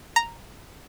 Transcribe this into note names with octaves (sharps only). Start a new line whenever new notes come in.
A#5